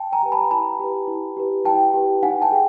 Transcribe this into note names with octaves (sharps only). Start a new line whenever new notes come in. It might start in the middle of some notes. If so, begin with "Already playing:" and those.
Already playing: G5 A5
G#5 A#5
G4 B4
A5 B5
E4 A5 B5
G4 B4
E4
G4 B4
E4 G5 A5
G4 B4
D#4 F#5 G#5
G5 A5
G#4